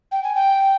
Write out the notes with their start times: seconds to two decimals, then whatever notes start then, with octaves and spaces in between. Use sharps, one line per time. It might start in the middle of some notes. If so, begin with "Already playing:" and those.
0.12 G5
0.23 G#5
0.35 G5